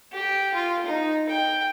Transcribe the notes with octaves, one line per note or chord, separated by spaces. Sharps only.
G4
F4
D#4
G5